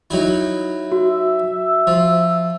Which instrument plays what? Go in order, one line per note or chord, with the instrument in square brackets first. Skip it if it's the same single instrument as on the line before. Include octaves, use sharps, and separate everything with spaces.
[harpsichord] F#3 D#4 E4
[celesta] F#4 [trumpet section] E5
[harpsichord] F3